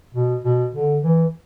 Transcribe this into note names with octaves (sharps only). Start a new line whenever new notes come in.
B2
B2
D3
E3